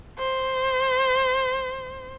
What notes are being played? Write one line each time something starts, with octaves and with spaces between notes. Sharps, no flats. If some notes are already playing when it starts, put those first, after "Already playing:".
C5